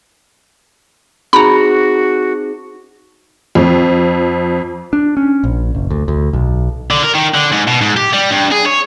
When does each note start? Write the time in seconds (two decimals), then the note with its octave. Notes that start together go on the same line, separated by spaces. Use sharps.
1.33 C4 D#4 F#4 G#4 A#5 B5
3.55 F2
4.93 D4
5.17 C#4
5.44 A#1
5.75 F#1
5.90 D2
6.08 D2
6.33 B1
6.90 D3
7.03 A#4
7.14 D#3
7.34 D3
7.52 G#2
7.67 B2
7.81 G#2
7.97 G4
8.13 G3
8.31 G2
8.51 G#4
8.66 C#5